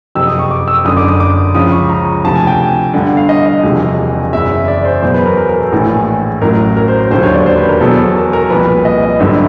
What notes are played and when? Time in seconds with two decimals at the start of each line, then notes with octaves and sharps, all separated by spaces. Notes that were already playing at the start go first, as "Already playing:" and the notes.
0.15 F#1 F2 C3 E6
0.27 D#6
0.39 C#6
0.51 D6
0.68 E6
0.85 F#1 F#2 D3 D#6
0.97 D6
1.08 D#6
1.20 D6
1.55 C#2 C#3 F3 D#6
1.72 C#6
1.89 A#5
2.24 D2 C3 F3 A5
2.36 G#5
2.47 G5
2.94 G1 G2 D3 F#5
3.05 F#5
3.17 F5
3.29 D#5
3.46 D#5
3.63 E1 E2 C3 F3
4.33 F#1 E2 C#3 E5
4.68 D5
4.85 C5
5.02 E2 B2 F#3 C5
5.14 B4
5.26 A#4
5.37 A#4
5.49 A#4
5.60 A4
5.72 A#1 A2 E3
6.42 A1 A2 F#3 A#4
6.77 A#4
6.88 C5
7.00 C5
7.11 E1 D#2 D3 F#3 C5
7.23 C#5
7.34 D5
7.46 C5
7.57 B4
7.69 A#4
7.81 E2 B2 F#3 A4
8.15 A#4
8.33 A#4
8.50 C2 A#2 F3 B4
8.85 D#5
9.02 D#5
9.19 G#1 G2 D3 F#3 E5